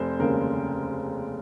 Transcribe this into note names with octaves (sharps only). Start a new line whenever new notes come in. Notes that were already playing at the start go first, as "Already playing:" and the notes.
Already playing: F1 C5
D#2 C#3 G#3 A#4